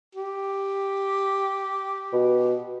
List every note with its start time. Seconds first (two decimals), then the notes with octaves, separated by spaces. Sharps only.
0.15 G4
2.13 B2